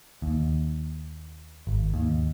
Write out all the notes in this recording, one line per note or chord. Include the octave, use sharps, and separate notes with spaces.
D#2
G#1
D#2